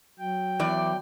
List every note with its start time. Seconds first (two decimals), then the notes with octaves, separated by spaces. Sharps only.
0.19 F#3 G5
0.60 E2 D5